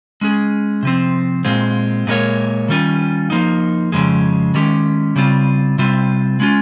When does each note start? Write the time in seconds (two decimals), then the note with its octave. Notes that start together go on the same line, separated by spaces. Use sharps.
0.21 G#3 C#4 G#4
0.83 C3 F3 C4
1.45 A#2 G#3 C4 F4
2.07 A#2 G#3 D#4 A#4 C#5
2.68 D#3 G3 C#4 F4
3.30 F3 A#3 D#4
3.92 F2 C#3 F3 G#3
4.54 D#3 G#3 C#4 G4
5.16 C#3 G3 C4 F4
5.78 C3 G3 C4 F4
6.40 G#3 C#4 F4